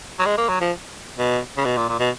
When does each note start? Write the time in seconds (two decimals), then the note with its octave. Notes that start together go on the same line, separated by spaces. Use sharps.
0.19 F#3
0.26 G#3
0.38 A#3
0.49 F#3
0.61 F3
1.18 B2
1.57 C#3
1.65 B2
1.77 A#2
1.89 A#2
1.99 B2